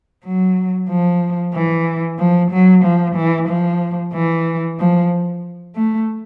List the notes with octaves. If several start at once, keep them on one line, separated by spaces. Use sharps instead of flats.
F#3
F3
E3
F3
F#3
F3
E3
F3
E3
F3
A3